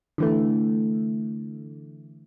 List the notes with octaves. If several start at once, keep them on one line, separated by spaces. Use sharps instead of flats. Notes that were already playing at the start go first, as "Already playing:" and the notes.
D3 E3 A3